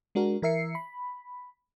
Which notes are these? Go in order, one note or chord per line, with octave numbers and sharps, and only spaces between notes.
G#3 D4 F#4 A#4
E3 A#4 E5 C7 C#7
B5